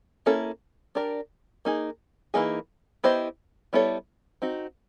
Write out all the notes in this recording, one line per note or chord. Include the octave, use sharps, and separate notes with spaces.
A#3 C#4 E4 A4
D4 G4 A#4 D5
A#3 D#4 G#4
E3 G3 A#3 D#4 G#4
B3 E4 G4 C5 D#5
G3 B3 E4 A4 C#5
C4 D#4 F#4